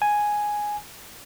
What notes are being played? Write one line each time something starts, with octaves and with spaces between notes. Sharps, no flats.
G#5